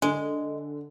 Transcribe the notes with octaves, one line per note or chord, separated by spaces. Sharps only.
D3 G#3